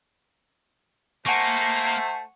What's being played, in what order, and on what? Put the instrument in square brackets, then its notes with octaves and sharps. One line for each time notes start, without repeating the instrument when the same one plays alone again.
[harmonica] A3 C5 [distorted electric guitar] A#3 [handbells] F#5 G#5 C#6 [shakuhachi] A5